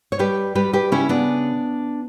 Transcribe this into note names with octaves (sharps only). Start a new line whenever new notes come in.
C#5
G3 G4 B4
G3 G4 B4
G4 B4
C#3 C#4 E4
B3 D4